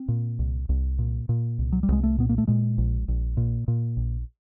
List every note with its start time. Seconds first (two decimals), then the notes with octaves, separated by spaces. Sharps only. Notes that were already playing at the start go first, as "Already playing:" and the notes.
Already playing: C4
0.08 A#2
0.39 C2
0.69 C2
0.99 A#2
1.29 A#2
1.59 C2
1.72 F#3
1.83 G3
1.89 C2 G#3
2.03 A3
2.18 A#2 B3
2.29 A#3
2.38 A3
2.47 A#2 G#3
2.78 A#1
3.08 A#1
3.37 A#2
3.68 A#2
3.97 A#1